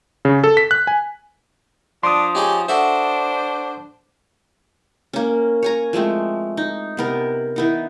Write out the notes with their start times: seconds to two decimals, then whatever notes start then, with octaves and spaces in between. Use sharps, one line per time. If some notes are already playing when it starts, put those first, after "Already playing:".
0.25 C#3
0.44 A4
0.57 B6
0.71 F#6
0.87 G#5
2.03 F3 D4 C6 D#6
2.35 C#4 D#4 G4 G#4
2.69 D4 F#4 A4 C5 E5
5.13 A#3 C#4
5.63 C#5 G#5 A#5
5.93 F3 G#3 A3 C4
6.57 D#4
6.97 C3 B3 A#4
7.56 E3 B3 D#4